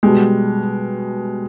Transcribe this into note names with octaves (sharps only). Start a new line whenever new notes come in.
B2 G3 G#3